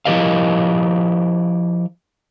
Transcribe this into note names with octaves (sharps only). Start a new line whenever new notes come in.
F3 E4 G4 A#4 D#5 F5